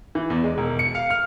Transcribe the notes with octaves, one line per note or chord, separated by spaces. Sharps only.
E3
E2
G#3
E1
C#7
F5
F6